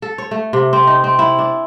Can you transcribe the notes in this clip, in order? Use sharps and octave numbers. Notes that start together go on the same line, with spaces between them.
A4
C#5
A3
C3
C4
D#4
C4
E4
D4